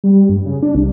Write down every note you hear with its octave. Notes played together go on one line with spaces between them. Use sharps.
G3
G2
C#3
D4
C2